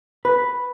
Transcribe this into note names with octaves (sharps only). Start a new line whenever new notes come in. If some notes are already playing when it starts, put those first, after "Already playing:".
B4